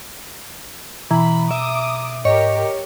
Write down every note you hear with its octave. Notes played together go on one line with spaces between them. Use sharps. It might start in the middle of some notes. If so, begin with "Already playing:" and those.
B2 E3 A#5 B5
E5 D6 D#6
G#2 G4 A#4 C#5 D#5